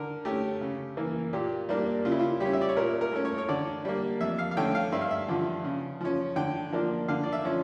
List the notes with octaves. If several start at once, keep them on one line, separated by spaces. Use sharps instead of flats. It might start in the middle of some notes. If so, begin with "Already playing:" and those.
Already playing: D3 A#4
A3 C#4 G4
C#3
E3 A#3
A#2 G4
G3 A#3 D4
C#3 F4
E4
F4
G3 C#4 G4
E5
D5
C#5
A#2 A#4
A#4
A3 C#4
C#5
C#5
D3 D5
G3 A#3
F2 E5
F5
F5
D3 A3 C#4 G5
F5
G2 E5
F5
E5
D3 F3
C#3
F3 C#4
D3 G5
F3 A#3 D4
D3 F5
D5
E5
F3 C#4